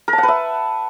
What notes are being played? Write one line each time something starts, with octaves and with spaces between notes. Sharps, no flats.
A#4
A5
F#5
B4
E5